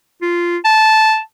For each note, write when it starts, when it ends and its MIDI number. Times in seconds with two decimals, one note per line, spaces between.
0.22 0.57 65
0.65 1.19 81